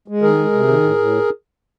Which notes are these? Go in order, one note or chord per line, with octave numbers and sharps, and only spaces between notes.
G#3
D#3 G#4 A#4
G#3
C3
D#3
A2
A2